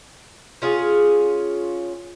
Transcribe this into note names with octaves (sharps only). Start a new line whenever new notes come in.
C#4 F4 G#4